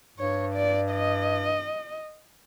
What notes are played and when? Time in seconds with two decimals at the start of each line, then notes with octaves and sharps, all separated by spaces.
0.18 G2 C#5
0.54 D5
0.91 D#5